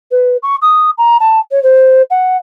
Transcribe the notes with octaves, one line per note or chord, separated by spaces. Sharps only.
B4
C#6
D#6
A#5
A5
C#5
C5
F#5